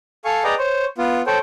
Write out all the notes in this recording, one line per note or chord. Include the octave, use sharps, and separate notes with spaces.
A4 F5 G#5 C#6
G#4 B4 D5 D#5 G5 A#5
C5 C#5
B3 F4
A4 C5 C#5 G5